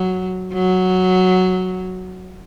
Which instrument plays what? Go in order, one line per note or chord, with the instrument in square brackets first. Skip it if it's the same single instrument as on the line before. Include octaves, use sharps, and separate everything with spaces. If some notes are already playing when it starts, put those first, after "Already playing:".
Already playing: [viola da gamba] F#3
F#3